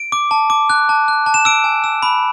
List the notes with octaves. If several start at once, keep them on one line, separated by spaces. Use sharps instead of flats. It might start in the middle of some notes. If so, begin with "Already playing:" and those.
Already playing: D7
D6
A5
D6
F#6
A5
F#6
A5
E7
E6 D7
G#5
E6
B5